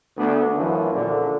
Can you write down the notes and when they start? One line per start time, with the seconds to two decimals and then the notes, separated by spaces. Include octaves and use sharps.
0.17 D2 A3 B3 D4
0.56 F#2 E3 F3
0.94 A#1 A#2 D3